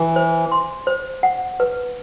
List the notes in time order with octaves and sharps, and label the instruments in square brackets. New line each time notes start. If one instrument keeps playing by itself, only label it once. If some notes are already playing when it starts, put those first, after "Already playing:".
Already playing: [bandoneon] E3
[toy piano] C5
C6
C5
F#5
B4